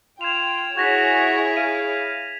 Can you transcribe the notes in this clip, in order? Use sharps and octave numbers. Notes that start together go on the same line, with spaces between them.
F4 G5 G#6 E7 F7
E4 F#4 G#4 C#5 G#6 A#6 B6
F5 D#7